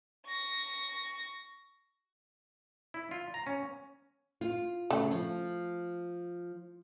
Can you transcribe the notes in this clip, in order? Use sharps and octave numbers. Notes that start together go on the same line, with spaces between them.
C#6 A#6
E4
F4
A#5
C#4
F4
C#3 A3
F3